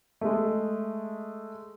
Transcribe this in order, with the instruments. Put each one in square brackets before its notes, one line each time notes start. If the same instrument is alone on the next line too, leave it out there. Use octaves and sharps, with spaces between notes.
[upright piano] G#3 A3